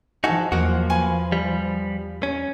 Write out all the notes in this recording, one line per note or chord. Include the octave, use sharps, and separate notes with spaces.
F3 D#4 F#4 G#4 A4
E2 F#3 A#3 F#4 D#5
B4 G#5 C#6
G3
C#4